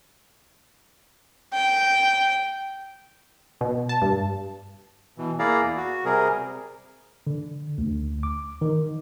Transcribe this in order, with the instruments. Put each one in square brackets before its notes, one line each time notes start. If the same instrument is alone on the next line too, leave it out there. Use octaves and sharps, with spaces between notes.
[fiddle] G5
[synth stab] B2
A5
G2
[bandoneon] B2 E3
A#3 E4 G#4 D5 F5 A#5
E2
F#4
C3 G3 G#4 A#4
[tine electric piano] D3
D2
D6
D#3